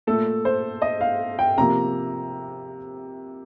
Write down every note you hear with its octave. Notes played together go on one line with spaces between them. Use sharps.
A#2 A3 A4
C5
D#5
F5
G5
C3 F3 A#3 A#5